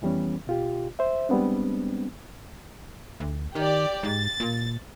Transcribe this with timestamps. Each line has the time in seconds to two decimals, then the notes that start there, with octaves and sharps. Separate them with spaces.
0.02 F2 E3 G3 B3 C#4
0.47 B2 F4 G4
0.99 C5 E5
1.29 G3 G#3 B3 C4 D4
3.20 D2
3.55 D#3 G4 D5
4.03 G#2 A6
4.40 A#2